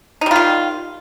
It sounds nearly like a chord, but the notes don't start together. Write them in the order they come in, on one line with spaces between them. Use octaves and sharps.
D#4 G3 F4 D#3